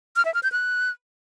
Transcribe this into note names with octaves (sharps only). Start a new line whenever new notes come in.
F6
E5
F6
G6
F#6